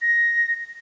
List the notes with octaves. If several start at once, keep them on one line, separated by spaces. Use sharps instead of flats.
A#6